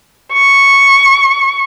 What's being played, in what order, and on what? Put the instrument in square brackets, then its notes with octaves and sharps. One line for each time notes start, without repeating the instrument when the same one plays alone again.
[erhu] C#6